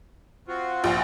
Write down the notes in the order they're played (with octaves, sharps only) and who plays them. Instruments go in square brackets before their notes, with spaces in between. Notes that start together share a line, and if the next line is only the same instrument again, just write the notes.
[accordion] C4 F4 F#4
[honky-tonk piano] A#1